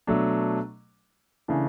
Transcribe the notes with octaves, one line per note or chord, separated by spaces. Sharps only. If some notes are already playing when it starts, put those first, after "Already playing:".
B2 F#3 A3 D4
C#3 E3 A3 D4